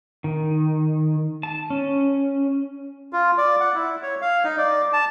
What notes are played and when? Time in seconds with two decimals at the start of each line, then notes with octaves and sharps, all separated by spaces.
0.24 D#3
1.43 A5
1.70 C#4
3.13 F4
3.38 D5
3.60 F#5
3.75 E4
4.03 C#5
4.22 F5
4.44 D#4
4.58 D5
4.93 A5